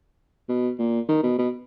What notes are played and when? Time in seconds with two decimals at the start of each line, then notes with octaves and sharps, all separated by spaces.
0.49 B2
0.79 A#2
1.09 D#3
1.24 B2
1.38 B2